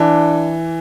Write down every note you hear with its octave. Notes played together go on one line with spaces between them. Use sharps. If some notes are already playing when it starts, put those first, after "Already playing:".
Already playing: E3 D4